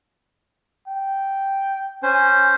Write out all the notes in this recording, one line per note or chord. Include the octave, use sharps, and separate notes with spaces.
G5
C#4 C5 G#5